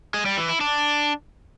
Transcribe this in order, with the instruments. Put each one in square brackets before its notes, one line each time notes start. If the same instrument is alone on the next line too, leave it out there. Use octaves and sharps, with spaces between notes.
[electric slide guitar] G#3
G3
E3
E4
D4